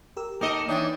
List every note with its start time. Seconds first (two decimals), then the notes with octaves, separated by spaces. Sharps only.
0.17 G4 A#4 E6
0.41 A#3 D#4 A4 A#4 D#5 G5
0.68 D#2 E3 D4 D#4 C#5 E5 G5